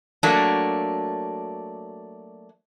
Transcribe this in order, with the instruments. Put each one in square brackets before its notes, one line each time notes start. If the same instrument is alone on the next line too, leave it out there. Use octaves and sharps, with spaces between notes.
[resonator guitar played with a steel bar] F#3 A3 A#3 D4